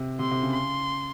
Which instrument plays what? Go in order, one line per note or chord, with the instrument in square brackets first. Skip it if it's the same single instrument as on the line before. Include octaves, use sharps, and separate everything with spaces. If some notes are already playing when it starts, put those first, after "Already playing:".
Already playing: [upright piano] C3
[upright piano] C3 [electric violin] C6
[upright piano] C3
C#3
[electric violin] C6